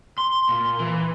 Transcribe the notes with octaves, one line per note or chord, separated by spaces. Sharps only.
C6
A#2
E3